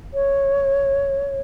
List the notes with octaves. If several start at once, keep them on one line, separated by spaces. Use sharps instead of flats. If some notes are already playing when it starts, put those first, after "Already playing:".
C#5